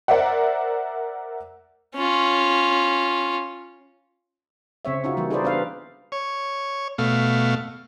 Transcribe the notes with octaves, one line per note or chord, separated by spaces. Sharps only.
A#4 C5 D5 E5 F#5
C#4 F4
C#3 C4 C#5 E5
C#4 D#4 F4 F#4
E3 G3 A#3
D#4 G#4 A4 B4 C5 D5
B3 D4 B4 F5
C#5
B2 A3 F5